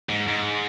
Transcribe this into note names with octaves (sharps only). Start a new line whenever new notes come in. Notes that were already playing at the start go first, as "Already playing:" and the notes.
G#2
G#2